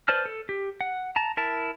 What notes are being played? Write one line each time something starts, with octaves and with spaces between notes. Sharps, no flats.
B4 C5 D5 A5 F6
A4
G4
F#5
A5 A#5
E4 A#4 A5